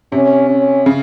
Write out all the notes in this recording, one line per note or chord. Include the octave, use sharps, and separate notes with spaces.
C3 C#4
C#4
C#3